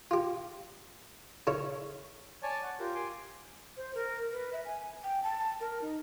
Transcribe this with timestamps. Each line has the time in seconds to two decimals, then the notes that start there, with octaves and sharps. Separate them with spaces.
0.11 F4 G4
1.47 C#3 E4 A4 C#5
2.43 C#5 D5 G#5 A5
2.63 F#5
2.80 F4 G4 A#4
2.95 G#5 C6 D6
3.77 C5
3.95 A#4
4.32 B4
4.53 E5
4.65 G#5
5.04 G5
5.23 A5
5.61 A#4
5.81 D#4